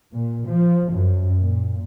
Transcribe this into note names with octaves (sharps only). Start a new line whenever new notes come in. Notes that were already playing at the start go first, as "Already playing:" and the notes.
A#2
F3
F#2
A#2